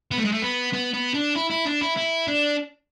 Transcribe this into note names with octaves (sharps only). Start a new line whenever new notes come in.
B3
A3
G#3
A3
B3
B3
B3
D4
E4
E4
D4
E4
E4
D4